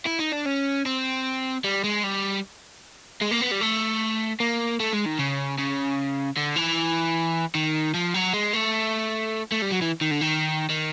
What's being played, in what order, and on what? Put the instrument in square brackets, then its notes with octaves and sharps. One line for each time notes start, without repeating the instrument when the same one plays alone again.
[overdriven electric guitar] E4
D#4
D4
C#4
C4
G3
G#3
G3
G#3
A#3
B3
G3
A3
A#3
A3
G#3
D#3
C#3
C#3
D3
E3
D#3
F3
F#3
G#3
A3
A3
G3
F#3
E3
D#3
D3
D#3
D#3